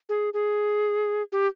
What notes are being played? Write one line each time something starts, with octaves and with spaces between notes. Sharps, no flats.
G#4
G#4
G4